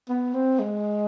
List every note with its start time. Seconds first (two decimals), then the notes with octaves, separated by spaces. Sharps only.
0.09 B3
0.34 C4
0.59 G#3